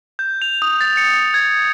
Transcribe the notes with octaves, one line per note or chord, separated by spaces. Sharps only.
G6
F7
D#6
A6
C#7
G#6